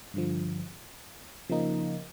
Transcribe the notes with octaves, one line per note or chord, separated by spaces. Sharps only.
G2 D3 F3
C#3 F3 A#3 D#4